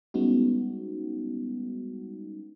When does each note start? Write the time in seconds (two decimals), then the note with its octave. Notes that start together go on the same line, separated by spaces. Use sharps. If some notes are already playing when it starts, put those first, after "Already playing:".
0.14 G3 G#3 B3 C#4 D#4 F#4